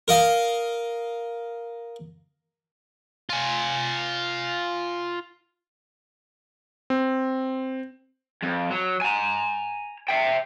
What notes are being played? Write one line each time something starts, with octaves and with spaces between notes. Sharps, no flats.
A#4 D#5 F5
F4 G#5
C4
F2
F#3
G#5 A#5
E5 G5